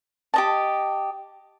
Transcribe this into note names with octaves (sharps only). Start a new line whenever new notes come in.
G4 D#5 A5